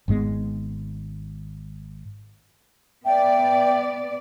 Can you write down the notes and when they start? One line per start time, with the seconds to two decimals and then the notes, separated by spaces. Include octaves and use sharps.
0.08 G#1 G#2 G#3 B3
3.05 B3 D5 E5 G5